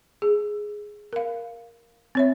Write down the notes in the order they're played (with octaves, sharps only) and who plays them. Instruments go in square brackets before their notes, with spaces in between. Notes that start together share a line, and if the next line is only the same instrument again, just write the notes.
[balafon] G#4
A#4 F5
C4 C#5 E5